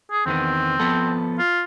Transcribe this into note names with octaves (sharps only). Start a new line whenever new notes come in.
G#4
E2 D#3 B3 C4
F3 B3 A4
F4